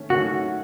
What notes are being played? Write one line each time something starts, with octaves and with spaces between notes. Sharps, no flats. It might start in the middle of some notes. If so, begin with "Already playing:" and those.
Already playing: D#3 A3 C#4
D#3 F#3 A3 C#4 F#4